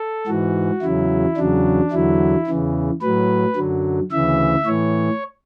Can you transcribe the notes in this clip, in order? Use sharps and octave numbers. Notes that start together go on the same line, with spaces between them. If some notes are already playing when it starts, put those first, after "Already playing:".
Already playing: A4
G#2 E3 F#4
E2 C#3 F#3 E4
E2 C#3 F#3 D4
E2 D3 F#3 E4
E2 C#3 E3
A2 F#3 B4
F#2 D3 F#3
D2 C#3 E3 E5
A2 E3 C#5